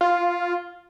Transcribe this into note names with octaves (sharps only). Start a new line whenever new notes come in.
F4